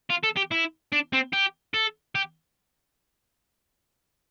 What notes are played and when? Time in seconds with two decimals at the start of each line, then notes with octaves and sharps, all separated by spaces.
0.10 F4
0.24 A4
0.37 G4
0.51 E4
0.92 D4
1.13 C4
1.33 G4
1.74 A4
2.15 G4